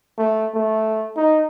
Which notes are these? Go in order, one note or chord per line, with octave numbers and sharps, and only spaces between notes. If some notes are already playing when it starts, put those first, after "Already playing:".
A3
A3
D#4